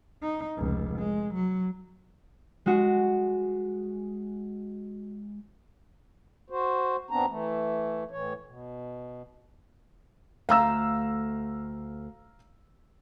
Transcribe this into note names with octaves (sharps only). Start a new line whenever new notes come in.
D#4
F1 C#2
G#3
F#3
G#3 F#4
F#4 C5
F#2 B3 C4 D4 A#5
E3 A3
A2 E3 C#5
B2
D2 A3 F5 A#5 E6